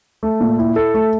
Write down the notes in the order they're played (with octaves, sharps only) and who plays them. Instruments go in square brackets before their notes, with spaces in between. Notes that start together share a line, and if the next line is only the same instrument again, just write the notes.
[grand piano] A3
A#2
E4
A4
A3